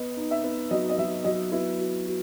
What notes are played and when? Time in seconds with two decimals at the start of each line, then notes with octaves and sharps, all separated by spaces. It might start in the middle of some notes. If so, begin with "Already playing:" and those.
Already playing: B3 D#5
0.17 D#4
0.31 E5
0.44 B3
0.71 F#3 D#5
0.89 D#5
0.98 F#3 E5
1.24 F#3 D#5
1.52 B3 E4
1.78 F#4
2.06 F#4